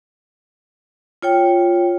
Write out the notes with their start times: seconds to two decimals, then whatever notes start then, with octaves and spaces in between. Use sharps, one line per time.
1.23 F4 C#5 G5